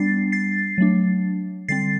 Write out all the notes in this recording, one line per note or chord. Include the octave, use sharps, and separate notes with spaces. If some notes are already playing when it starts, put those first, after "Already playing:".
Already playing: G3 B3 D4 A6 C7
A6 C7
F#3 A3 D4
D3 G3 C4 A6 C7